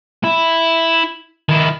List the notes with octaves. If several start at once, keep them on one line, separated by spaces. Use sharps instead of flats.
E4
D#3 E4